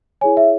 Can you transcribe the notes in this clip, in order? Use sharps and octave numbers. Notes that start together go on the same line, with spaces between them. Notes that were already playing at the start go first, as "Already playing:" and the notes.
E4 G#4 C#5 G#5
E5